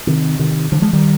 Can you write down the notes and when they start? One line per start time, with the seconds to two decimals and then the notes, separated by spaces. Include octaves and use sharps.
0.07 C3 D#3
0.39 C3 D#3
0.72 D3 F3
0.82 F3 G#3
0.93 D#3 G3